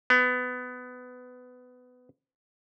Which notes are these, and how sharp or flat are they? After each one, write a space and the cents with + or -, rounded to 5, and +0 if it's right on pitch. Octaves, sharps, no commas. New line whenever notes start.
B3 +20